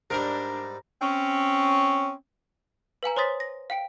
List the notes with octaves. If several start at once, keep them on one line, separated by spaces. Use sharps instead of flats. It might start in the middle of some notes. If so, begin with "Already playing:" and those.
G#2 G3 D4 A#4
C4 C#4
B4 F5 G#5 A#5
C5 C#5 C6 D#6 A6 B6
A#6
F5 G5 D7